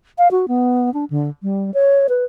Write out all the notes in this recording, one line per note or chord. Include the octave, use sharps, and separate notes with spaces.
F5
F#4
B3
D4
D3
G3
C#5
B4